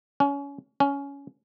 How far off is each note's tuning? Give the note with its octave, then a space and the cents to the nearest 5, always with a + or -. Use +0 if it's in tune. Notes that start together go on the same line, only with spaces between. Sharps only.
C#4 +25
C#4 +15